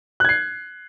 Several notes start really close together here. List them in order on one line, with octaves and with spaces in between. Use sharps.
F#6 G#6 C7